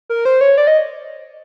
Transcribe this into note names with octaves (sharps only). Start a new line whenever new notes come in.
A#4
C5
C#5
D5
D#5